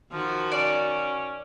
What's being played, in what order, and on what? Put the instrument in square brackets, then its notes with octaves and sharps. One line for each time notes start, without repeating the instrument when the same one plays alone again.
[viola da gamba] D#3 F#4 [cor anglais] F3
[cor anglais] C#4 [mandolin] D5